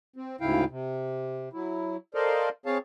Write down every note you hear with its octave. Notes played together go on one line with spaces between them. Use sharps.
C4
D2 G#2 C#3 E4 F5 G5
C3
F#3 E4
A4 A#4 C5 D5 D#5 F5
C4 G#4 C#5 F5 A5